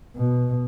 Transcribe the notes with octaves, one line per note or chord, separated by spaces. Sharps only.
B2